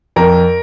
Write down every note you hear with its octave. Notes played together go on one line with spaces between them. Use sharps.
F2 A#4